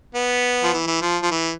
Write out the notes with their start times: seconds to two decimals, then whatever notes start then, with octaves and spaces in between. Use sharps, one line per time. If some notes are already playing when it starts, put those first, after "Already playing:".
0.14 B3
0.63 F3
0.73 E3
0.87 E3
1.02 F3
1.22 F3
1.31 E3